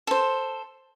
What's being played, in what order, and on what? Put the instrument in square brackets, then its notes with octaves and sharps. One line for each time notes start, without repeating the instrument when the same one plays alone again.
[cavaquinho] A4 C5